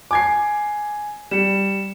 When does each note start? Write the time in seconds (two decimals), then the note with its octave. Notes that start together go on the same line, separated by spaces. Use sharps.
0.11 G#5 D6 G#6 C7
1.31 G3 C#7 E7